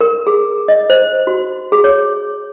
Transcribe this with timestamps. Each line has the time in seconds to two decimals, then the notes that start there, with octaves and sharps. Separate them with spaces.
0.01 A#4
0.27 G#4
0.68 D#5
0.90 C5
1.27 F#4
1.72 G#4
1.84 C#5